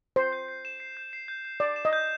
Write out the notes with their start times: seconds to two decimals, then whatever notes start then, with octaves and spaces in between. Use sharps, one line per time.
0.16 C5 C7
0.33 G6
0.49 C7
0.65 E7
0.80 C7
0.97 G6
1.13 C7
1.28 G6
1.45 G6
1.60 D5 E7
1.76 E7
1.85 D#5
1.93 G6